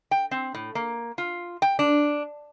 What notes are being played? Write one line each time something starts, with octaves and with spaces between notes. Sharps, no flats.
G5
C4
A2
A#3
F4
G5
D4